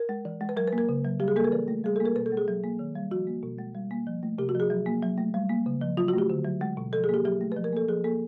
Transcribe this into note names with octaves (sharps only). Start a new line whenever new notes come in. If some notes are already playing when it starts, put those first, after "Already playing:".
Already playing: A#4
G#3
E3
G#3
B4
F#3 A#4
B4
A#3
A#4
C#3
F#3
G3 G4
G#4
A#3 A4
A#4
E3 B4
A3
G3 G#4
A#3 A4
A#4
B2 B4
A4
G#3
G#4
F#3
A#3
D#3
G3
F3 F#4
A#3
B2
G#3
G3
A#3
F3
A3
C3 G4
F#4
F3
G#4
F#3
A#3
F#3
A3
G3
A#3
C#3
F3
F#3 F4
F#4
A3 G4
D3
F#3
G#3
B2
F3 A4
G#4
A#3 G4
F#3 G4
A3
F3 B4
A#4
A#3 A4
F3 G#4
A#3 A4